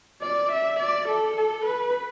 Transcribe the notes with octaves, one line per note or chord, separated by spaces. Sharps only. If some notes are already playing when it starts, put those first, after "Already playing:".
D5
E5
D5
A4
A4
B4